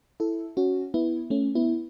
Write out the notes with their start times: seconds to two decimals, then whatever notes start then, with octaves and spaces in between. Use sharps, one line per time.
0.20 E4 A4
0.57 C#4 F#4
0.94 B3 E4
1.30 A3 C#4
1.55 B3 E4